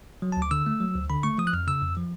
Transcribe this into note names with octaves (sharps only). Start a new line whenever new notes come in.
F#3
A5
D2
D6
D3 E6
A3
F#3
D2
D3 B5
A3 C#6
F3 D#6
F#6
F2 F6
C#3 E6
F2
F3